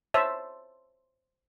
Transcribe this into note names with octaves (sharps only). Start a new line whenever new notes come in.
C5 C#5 E5 A5